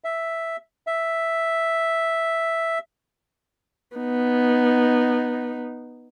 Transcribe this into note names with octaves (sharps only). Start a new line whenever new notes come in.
E5
E5
B3 D#4